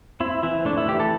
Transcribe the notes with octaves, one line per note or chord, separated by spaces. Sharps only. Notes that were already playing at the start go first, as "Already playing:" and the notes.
C4 E4
E3 E4
A3 D4
E4
E3 G4
A4